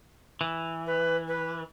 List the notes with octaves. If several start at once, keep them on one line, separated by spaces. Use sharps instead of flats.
E3
B4
B4